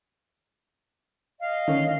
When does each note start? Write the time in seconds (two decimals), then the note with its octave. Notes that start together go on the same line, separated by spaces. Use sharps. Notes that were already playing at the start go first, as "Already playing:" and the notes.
1.39 D#5 F5
1.68 D3 D#3 C#4